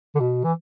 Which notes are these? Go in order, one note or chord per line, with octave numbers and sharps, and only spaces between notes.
D3
B2
E3